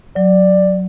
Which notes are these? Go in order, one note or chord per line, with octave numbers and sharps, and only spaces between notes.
F#3 D5